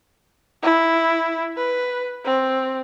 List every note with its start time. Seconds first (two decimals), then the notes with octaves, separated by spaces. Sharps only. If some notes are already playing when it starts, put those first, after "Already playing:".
0.63 E4
1.57 B4
2.25 C4